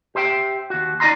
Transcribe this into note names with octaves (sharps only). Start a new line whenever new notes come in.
G4 C5 E5 G5
D#2 F#4
C#4 D#4 D5 D#5 A#5 C6